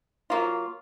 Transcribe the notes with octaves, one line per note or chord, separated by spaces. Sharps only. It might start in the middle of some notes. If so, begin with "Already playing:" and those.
F#3 A#3 F4